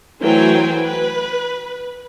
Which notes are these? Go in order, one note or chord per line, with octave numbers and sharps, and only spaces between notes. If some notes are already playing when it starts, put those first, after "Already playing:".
E3 F#3 A3 C5 G5 G#5
B4